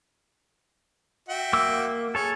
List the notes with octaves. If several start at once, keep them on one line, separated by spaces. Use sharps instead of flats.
F#4 E5 G5
A#3 D6 E6
G#4 A4 C#5